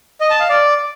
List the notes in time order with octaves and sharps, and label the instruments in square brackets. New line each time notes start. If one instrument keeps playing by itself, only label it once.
[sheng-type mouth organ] D#5
A5
F5
D5